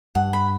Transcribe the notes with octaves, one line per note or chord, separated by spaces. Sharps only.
G2 F#5
B5